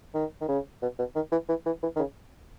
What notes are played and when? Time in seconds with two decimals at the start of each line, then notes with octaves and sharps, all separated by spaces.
0.14 D#3
0.41 D#3
0.49 C#3
0.82 B2
0.99 B2
1.16 D#3
1.32 E3
1.49 E3
1.66 E3
1.83 E3
1.96 D#3
1.99 C#3